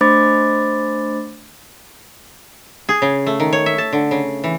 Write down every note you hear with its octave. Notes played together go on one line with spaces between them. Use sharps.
A3 D4 C5 B5 D6 A6
G#4
C#3
A3
D#3
C#5
E5
A5
D3
C#3
E3